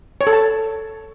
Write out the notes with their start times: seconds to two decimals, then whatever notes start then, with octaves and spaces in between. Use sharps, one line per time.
0.21 C#5
0.27 A4
0.33 A5